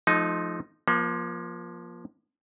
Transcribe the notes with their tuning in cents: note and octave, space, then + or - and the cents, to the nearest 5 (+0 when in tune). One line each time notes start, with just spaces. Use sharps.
F3 +0 A3 -40 D#4 +0
F3 +5 A#3 +35